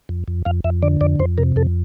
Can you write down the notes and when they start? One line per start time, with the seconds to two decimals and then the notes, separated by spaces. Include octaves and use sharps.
0.09 F2
0.28 F2
0.45 F2 F5
0.64 F2 E5
0.83 D3 D5
1.01 F2 D5
1.19 F2 C5
1.38 C3 A#4
1.56 F2 A4